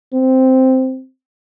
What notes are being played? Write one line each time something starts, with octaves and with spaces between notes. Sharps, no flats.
C4